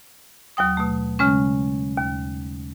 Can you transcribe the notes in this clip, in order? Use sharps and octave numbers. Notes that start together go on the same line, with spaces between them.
D#2 F#3 G5 D#6
B2 A3
C#3 G#3 C#4
D#2